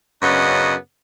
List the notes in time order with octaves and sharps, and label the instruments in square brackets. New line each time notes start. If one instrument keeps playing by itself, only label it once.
[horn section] F#2 C#3 B3 D4 D#5